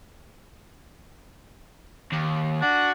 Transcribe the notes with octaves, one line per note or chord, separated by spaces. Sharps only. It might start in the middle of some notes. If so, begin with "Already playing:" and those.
D#2
D4 F#4